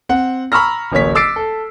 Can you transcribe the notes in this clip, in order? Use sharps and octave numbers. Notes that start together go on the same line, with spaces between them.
C4 F#5
A#5 B5 C#6 E6 F6 A#6
D1 A1 A#3 C#5 B6
D6 E6 A6 C7 D7
A4